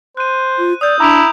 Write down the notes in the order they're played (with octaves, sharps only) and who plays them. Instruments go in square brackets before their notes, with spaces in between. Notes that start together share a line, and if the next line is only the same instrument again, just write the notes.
[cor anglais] C5 [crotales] F#6 D#7
[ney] F4
[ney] D5 [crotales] D#6 E6 G6
[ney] D4 [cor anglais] E4 [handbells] A#5 [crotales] D6 D7 F7